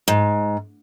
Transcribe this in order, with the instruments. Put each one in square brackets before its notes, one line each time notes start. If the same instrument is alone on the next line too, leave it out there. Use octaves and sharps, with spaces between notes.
[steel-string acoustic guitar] G#2